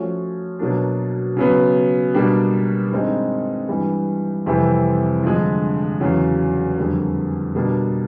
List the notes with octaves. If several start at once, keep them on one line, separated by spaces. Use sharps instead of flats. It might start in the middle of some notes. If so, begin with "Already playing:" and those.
Already playing: F3 A3 C#4 F#4
B2 F#3 A#3 D4
C#3 F#3 B3
B2 G3 A#3 D4 G4
G2 D#3 G#3 C4 D#4
G2 E3 G3
F2 C3 E3 G3 C4
G2 D3 F3 G#3
E2 C#3 F#3
F2 D3 G3 A#3
B2 G3 A#3 D4